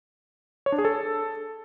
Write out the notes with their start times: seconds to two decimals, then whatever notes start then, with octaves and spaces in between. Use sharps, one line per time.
0.66 C#5
0.72 D4
0.78 G#4
0.85 A4